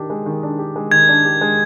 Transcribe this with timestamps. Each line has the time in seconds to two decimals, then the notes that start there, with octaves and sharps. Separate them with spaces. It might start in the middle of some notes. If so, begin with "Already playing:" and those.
Already playing: D#3 D4 G4
0.10 G#3
0.26 D#3
0.43 D4
0.59 G4
0.76 G#3
0.91 D#3 G#6
1.09 D4
1.25 G4
1.41 G#3